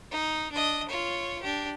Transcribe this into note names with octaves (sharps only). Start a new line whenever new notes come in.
D#4
D4 D#5
F4 C#5
D4 G4